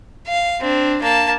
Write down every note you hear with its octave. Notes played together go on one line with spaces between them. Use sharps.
F5
C4 D4
A#3 A5